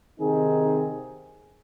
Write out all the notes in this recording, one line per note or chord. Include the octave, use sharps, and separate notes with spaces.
C3 D#3 C4 D#4 G#4